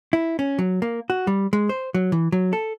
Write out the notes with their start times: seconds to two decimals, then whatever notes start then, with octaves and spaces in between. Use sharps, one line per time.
0.13 E4
0.39 C#4
0.59 F#3
0.82 A#3
1.10 F#4
1.27 G3
1.53 G#3
1.69 C5
1.94 F#3
2.12 E3
2.32 F#3
2.53 A4